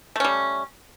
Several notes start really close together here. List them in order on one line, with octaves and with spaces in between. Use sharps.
A3 C#4 G3